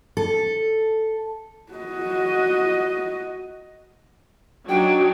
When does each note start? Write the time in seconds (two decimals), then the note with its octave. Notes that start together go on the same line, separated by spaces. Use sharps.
0.17 A4
1.73 F#4 D#5
4.69 F#3 D4 D#4 F#4 G5